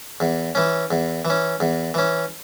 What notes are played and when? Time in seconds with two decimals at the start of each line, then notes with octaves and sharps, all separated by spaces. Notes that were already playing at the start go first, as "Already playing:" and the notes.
0.20 E2
0.55 E3 C#4
0.91 E2
1.25 E3
1.30 C#4
1.60 E2
1.94 E3 C#4